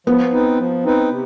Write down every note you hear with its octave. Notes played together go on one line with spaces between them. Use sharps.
F3 B3
C4 D#4 B4
F3
C4 D#4 B4
C3